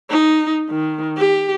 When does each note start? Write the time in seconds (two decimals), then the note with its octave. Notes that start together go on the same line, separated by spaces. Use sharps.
0.10 D#4
0.70 D#3
1.17 G4